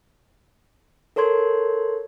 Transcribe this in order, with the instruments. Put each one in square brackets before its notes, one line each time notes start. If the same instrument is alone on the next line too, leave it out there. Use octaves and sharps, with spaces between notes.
[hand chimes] A4 A#4 C#5 C6 G#6